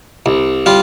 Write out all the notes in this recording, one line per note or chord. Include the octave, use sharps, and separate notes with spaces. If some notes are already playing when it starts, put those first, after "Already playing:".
C2
G3 F4